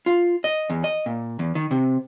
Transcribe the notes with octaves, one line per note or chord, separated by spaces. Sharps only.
F4
D#5
E2
D#5
A#2
E2
D#3
C3